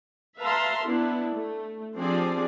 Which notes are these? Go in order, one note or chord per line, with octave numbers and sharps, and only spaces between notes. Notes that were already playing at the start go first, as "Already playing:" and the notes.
B4 E5 F5 A5 A#5 C6
B3 D4 E4
A3
F3 C4 D4 G4 G#4 D5